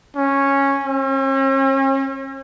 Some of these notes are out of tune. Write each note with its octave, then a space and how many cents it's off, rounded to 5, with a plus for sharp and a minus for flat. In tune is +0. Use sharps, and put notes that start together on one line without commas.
C#4 -5
C#4 -45